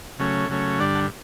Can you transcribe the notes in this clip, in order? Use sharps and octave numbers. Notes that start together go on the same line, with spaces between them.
C#3 F#3 A3 C#4
C#3 F#3 A3 C#4
G2 D3 G3 D4 D5 F#5
F#5 A5